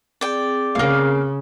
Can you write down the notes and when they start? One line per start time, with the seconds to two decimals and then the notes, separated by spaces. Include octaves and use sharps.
0.21 C4 G#4 D5 G5
0.75 C#3 A#3 F5